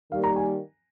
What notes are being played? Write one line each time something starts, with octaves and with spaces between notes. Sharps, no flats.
D#3 G3 A#3 F5
A#5
G#5